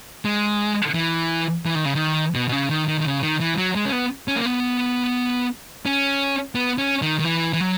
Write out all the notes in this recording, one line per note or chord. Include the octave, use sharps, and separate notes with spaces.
G#3
E3
E3
D#3
C#3
D#3
B2
B2
C#3
D#3
D#3
D#3
C#3
D#3
E3
F#3
G#3
C#4
B3
C#4
A#3
B3
C#4
B3
C#4
D#3
D#3
E3
E3
F#3